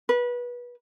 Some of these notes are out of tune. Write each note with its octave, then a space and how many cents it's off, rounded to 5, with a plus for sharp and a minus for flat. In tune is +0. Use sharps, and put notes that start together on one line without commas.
B4 -25